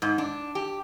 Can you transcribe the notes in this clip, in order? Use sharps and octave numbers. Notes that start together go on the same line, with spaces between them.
G#2
D4
G4